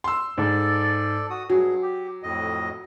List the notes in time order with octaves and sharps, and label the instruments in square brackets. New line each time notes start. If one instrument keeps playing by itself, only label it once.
[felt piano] C6 E6
[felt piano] G#2 [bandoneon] A4 D5
[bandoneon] F#4 D#6
[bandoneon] G2 G#4 [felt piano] F#3
[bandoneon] G4
F2 A2 D#5